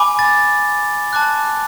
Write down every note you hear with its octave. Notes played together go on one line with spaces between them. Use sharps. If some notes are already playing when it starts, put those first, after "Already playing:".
Already playing: G#5 B5 D6
A6
A5 D6 F#6